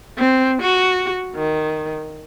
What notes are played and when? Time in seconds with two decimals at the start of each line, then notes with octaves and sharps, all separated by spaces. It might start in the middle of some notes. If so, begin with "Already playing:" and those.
0.18 C4
0.62 F#4
1.35 D#3